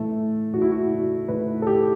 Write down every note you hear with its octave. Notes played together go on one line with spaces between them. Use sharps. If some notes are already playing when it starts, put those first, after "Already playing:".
Already playing: A2 E3 A3
A2 E3 F#4
E4
F#4
A2 E3 B4
A4
G4